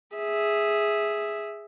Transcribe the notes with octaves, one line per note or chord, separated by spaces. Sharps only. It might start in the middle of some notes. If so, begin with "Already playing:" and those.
G#4 E5